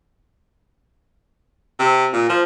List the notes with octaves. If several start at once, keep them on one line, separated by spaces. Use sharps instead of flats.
C3
A#2
F3